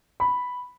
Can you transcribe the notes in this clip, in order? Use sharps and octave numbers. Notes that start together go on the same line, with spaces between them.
B5